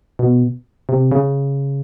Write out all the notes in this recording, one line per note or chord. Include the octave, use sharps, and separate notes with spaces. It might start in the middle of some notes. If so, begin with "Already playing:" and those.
B2
C3
C#3